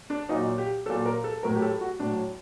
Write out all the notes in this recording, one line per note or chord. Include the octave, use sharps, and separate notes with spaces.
D4
A#2 F#3 D#4
G4
A#2 F#3 A4
A#4
A4
A2 F#3 A#4
G4
A4
F#4
A2 F#3 D4